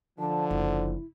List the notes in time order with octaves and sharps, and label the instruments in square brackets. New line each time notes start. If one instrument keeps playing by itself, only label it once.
[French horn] D3 [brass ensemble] F3 [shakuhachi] A5
[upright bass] F#1 [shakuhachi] E4